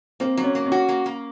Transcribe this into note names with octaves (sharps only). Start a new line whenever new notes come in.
A#3 C4 C5
F#3
C#4 C#5
A#3
C#4 C#5
F#4
A#3
A#3